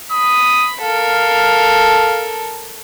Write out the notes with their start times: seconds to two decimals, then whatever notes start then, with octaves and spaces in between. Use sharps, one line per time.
0.12 B5 D#6
0.81 A4 A#4 F5